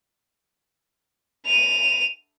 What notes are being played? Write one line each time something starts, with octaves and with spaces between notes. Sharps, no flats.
D#7 F7